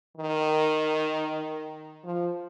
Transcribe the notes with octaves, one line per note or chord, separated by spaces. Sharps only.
D#3
F3